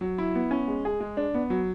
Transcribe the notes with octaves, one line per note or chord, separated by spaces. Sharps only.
F#3
E4
B3
C#4
G#3
G#4
G#3
D4
B3
F#3